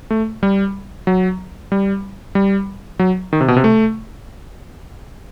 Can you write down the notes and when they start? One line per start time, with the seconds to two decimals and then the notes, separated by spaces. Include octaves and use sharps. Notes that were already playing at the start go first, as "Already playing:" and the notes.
0.10 A3
0.43 G3
1.07 F#3
1.72 G3
2.35 G3
2.99 F#3
3.33 D#3
3.41 C3
3.48 B2
3.56 C3
3.64 A3